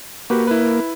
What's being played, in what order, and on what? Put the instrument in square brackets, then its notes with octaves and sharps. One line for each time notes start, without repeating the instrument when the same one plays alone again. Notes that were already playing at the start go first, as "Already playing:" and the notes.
[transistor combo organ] A#3 [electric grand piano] F#4 G4 B4
[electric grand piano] E4 B4